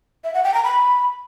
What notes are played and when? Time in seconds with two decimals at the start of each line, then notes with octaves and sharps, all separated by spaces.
0.24 E5
0.34 F#5
0.44 G5
0.54 A#5
0.64 B5